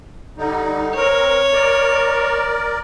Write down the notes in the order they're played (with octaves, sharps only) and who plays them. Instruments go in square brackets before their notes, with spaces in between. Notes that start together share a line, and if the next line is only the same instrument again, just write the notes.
[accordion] D3 G3 D#4
[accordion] C4 A#4 [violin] C#5
[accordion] A#4 D5